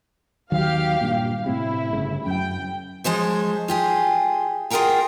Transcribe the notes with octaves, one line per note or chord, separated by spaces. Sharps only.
D#2 D#3 F#3 G4 F5
G2 A#2
A2 C3 E4
G1 C#3
F#2 G5
F3 G#3 C5 C#5
F4 G4 G#4
F4 G#4 A#4 F#5 G5 A#5